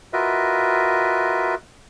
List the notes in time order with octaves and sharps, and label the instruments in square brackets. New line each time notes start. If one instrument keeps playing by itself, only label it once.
[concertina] F4 F#4 A#4 B4 D#5 E5